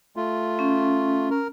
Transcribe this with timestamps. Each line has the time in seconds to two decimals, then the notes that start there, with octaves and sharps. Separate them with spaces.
0.16 A3 F4
0.59 C#4
1.30 A#4